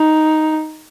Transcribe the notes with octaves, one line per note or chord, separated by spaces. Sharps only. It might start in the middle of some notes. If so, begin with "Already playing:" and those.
Already playing: D#4